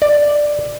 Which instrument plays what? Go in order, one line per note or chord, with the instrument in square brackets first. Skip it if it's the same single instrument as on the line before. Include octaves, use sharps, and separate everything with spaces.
[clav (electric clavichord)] D5